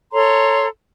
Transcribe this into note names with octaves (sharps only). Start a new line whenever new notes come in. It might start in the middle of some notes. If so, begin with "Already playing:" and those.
A4 C#5 A#5 C6